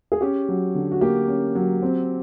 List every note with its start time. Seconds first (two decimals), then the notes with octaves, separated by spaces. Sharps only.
0.12 G#4
0.21 C#4 G4
0.49 F#3
0.75 D3
0.91 F#4
1.01 A#3 G4
1.28 C#4
1.55 F#3
1.82 C4